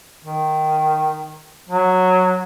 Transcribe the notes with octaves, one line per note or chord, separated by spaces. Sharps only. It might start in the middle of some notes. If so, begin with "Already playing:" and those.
D#3
F#3